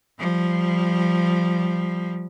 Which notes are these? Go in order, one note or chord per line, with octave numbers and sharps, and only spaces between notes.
F3 G3